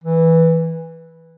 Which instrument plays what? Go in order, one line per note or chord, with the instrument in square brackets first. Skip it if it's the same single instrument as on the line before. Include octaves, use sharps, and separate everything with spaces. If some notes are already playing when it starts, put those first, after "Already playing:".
[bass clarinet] E3